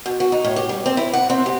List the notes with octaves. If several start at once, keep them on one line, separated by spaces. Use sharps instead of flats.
B2
F#4
D#4
A2
G4
G3
C4
E4
F#5
C4
G4